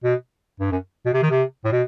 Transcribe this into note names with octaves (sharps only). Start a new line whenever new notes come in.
B2
G2
F#2
B2
C3
D#3
C3
A2
B2